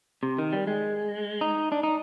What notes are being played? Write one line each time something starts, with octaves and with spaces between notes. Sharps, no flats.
C3
D#3
G3
G#3
D#4
D4
D#4